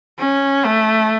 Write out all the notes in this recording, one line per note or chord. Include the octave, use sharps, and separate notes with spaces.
C#4
A3